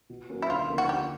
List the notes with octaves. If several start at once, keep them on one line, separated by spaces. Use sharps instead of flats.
B2
F#3 A#3 C#4
E4
D2 F4
C#3 F3 A#3 D#4
F#4
D3 G4